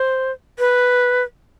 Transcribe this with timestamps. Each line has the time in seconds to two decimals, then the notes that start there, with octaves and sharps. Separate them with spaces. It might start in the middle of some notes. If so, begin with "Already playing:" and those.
Already playing: C5
0.59 B4